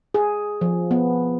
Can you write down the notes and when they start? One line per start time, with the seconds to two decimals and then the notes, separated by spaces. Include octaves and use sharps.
0.14 G#4
0.61 F3
0.91 B3